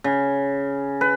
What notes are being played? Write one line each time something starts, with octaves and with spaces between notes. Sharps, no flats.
C#3
B4